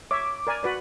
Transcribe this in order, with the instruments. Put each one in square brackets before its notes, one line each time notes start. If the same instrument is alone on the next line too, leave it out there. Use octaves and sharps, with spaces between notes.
[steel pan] C#5 E5 [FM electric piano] D6
[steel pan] A#4 D5 G#5
F#4 B4 D5